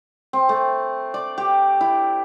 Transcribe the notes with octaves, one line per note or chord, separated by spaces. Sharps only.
C4
A3
D5
G4
E4